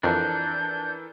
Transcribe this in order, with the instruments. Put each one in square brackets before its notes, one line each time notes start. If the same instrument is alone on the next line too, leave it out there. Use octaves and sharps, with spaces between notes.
[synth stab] F2 [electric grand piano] E3 A4 A#4 [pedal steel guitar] D4 [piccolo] G6